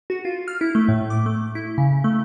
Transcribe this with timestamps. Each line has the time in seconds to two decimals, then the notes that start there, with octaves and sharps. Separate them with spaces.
0.10 F#4
0.25 F4
0.48 F6
0.61 E4
0.75 A3
0.88 A2
1.10 D6
1.26 A3
1.55 E4
1.78 C#3
2.04 A3